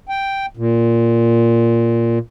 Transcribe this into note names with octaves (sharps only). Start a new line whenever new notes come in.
G5
A#2